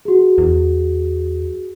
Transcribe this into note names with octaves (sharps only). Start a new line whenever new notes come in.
F#4 G#4
E2